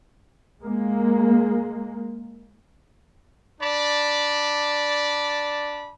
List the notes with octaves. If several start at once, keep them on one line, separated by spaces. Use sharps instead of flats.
G#3 A#3
D4 D5 A5 B5